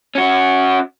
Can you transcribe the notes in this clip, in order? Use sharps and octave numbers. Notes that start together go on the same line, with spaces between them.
C#4 F#4